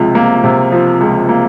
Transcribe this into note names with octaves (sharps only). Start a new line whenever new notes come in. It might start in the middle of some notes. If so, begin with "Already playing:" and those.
Already playing: C#2 C3 F3
A#3
C3
F3
C#2
A#3